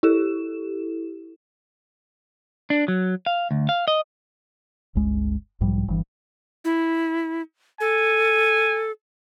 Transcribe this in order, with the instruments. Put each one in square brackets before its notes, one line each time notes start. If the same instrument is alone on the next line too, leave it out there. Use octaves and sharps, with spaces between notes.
[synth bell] E4 G4 A4 E7
[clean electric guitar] D4
F#3
F5
D2
F5
D#5
[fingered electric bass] G1 C#2 G#3
B1 G#2 F3 G3
G1 G2 E3
[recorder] E4
[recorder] A4 [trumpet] G#5